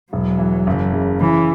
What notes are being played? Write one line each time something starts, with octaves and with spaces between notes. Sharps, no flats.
E1 F#3
E3
F#1
C#3
C#3 E3